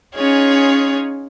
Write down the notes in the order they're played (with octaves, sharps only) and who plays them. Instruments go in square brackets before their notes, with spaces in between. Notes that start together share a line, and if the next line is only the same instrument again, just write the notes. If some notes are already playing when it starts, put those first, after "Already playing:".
[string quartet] C#4 D#4 F4 G#4 C#5